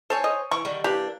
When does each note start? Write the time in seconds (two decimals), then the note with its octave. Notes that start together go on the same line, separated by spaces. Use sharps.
0.10 A4 C5 C#5 G#5
0.24 D#5
0.51 E3 C#6
0.65 D3 D#3 G3
0.84 E3 A#3 D4 G4